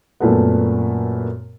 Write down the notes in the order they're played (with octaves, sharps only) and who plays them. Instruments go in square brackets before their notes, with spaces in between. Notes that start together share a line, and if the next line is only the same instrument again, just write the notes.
[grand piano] F#2 A#2 A3 B3